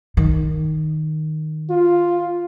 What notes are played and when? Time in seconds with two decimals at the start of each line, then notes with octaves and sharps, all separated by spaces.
0.17 D#3
1.70 F4